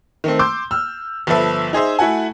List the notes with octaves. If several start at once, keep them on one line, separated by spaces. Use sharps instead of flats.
D#3 A3 C4
C6 D6 E6 G6
E6 F6
G1 F3 A4 B4 E5
D#4 G#4 C5 E5
A3 E4 F#4 F#5 G#5